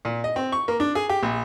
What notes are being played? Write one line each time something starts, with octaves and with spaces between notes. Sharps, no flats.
A#2
D#5
C4
C#6
A#3
D4
G#4
G4
A#1